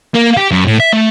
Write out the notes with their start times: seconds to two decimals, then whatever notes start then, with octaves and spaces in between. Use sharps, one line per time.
0.15 A#3
0.37 G4
0.51 F#2
0.67 A2
0.80 E5
0.93 A3